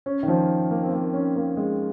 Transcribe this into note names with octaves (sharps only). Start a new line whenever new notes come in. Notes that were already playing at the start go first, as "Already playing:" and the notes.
C#4
D#3
F3
A#3
C4
A#3
C#4
A#3
G#3